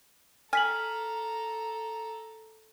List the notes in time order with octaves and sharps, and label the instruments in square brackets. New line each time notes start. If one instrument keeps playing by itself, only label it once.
[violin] A4 A#5 [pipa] G#5 [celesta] F6 B6 F#7